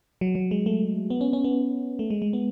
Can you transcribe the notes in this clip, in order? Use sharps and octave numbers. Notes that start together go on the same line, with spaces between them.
F#3
F#3
G#3
A3
B3
C#4
C#4
B3
A3
G#3
G#3
B3